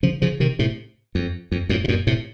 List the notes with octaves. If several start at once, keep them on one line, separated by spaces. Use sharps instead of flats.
C#3 F3
C#3 F3
C3 D#3
A2 C3
F2
F2
F2 A2
C3
F#2 A#2
A2 C3